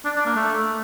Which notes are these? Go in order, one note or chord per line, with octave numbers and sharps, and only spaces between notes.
D4
D4
A#3
A3